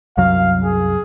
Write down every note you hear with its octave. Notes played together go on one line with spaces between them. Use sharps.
C2 F#2 F#3 F5
G#4